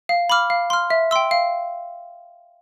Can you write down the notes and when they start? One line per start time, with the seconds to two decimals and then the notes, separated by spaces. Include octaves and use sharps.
0.09 F5
0.30 B5 D6 F6
0.50 F5
0.70 C6 F6
0.90 E5
1.11 G5 C6 E6
1.31 F5